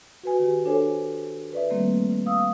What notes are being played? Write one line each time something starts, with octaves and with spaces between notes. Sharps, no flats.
F#4 B4 G#5
D#3 G4
D4 A4 C5 C#5 G#5
B4 D5 E5
D#3 G3 A3 A#3 C4
F5 D#6 E6